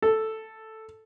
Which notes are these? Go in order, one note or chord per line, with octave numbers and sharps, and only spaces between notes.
A4